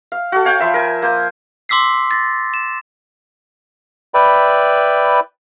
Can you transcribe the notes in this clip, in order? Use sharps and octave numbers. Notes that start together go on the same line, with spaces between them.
F5
F#4 A4
C#5 F5 G5 G#5
F3 E5 B5
A#4 G#5
A#3 C5
C6 D6 E6 B6 C7
A6 A#6
E7
B4 D5 E5 G5 B5